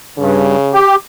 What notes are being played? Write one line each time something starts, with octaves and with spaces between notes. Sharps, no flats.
G2 C#3
G4